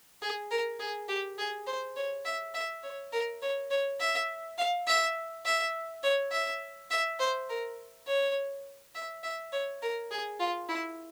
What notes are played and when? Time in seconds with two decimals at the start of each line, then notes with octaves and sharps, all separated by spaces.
0.22 G#4
0.51 A#4
0.79 G#4
1.08 G4
1.38 G#4
1.67 C5
1.96 C#5
2.25 E5
2.54 E5
2.83 C#5
3.12 A#4
3.42 C#5
3.70 C#5
4.00 E5
4.58 F5
4.87 E5
5.45 E5
6.03 C#5
6.32 E5
6.91 E5
7.19 C5
7.49 A#4
8.07 C#5
8.95 E5
9.23 E5
9.52 C#5
9.82 A#4
10.11 G#4
10.39 F4
10.69 E4